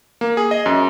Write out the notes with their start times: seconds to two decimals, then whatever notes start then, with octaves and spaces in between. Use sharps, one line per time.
0.21 A#3
0.37 G#4
0.51 D#5
0.66 F#2